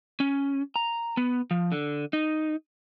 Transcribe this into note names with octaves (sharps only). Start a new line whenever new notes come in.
C#4
A#5
B3
F3
D3
D#4